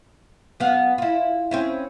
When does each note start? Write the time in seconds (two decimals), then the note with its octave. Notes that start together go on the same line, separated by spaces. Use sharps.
0.60 F#2 B3 F5
0.98 E4 F4
1.51 C4 C#4 E4